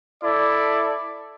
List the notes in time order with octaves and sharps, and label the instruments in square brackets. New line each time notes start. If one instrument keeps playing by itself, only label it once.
[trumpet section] E4 A4 D5